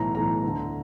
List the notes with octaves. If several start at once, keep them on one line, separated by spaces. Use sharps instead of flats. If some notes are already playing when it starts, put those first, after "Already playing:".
Already playing: B1 A2 E3 A#5
B1 A2 E3 A#5
D2 D3